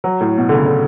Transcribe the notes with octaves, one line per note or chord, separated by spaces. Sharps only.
F#3
A2
B2
D3
C#3
D3